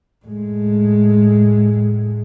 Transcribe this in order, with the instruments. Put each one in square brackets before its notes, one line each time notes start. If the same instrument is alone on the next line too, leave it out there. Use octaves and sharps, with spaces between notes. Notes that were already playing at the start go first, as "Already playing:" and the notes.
[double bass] A2 G#3